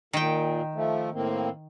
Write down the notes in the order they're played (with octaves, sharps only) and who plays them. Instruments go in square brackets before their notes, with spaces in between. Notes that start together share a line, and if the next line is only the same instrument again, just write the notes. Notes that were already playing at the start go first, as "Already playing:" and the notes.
[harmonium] A#2 [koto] D#3 G5
[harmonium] F3 A3
A2 A#3 C4